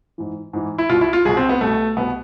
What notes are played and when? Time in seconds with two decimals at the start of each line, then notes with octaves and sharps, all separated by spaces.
0.18 G#2 E3
0.53 G#2 E3
0.78 E4
0.89 C2 B2 F4
1.01 E4
1.13 F4
1.25 C2 G#4
1.29 B2
1.37 C4
1.49 B3
1.61 C2 B2 A3
1.96 C2 B2 B3